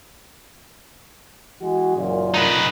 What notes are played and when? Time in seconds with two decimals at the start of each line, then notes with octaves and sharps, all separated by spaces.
1.61 E3 G#3 F#4
1.96 F#1 F#2 A#2
2.34 D#4 B4